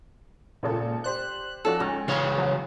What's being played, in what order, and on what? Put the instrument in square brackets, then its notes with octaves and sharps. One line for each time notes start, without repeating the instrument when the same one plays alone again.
[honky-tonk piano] G#1 C#3 A4 [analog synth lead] A#2
[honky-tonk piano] G4 C5 D5 [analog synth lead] F#6
[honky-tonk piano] F3 C#4 F#4 [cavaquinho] A4 D5
[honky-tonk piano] C#2 [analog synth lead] C#4 [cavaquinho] D#4
[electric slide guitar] C#3 E3 C#5 [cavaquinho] F5 C#6 [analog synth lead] C6
[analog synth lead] F#3